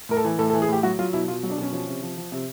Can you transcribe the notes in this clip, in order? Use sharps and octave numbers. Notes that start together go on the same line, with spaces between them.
A2 A#4
A4
E3
A2 A4
A4
E3
G#4
A2 G4
F#3 F#4
F#3 F4
B2 E4
B2 F4
F#3
D4
B2 C#4
F3 C#4
C3
F3
F3
C3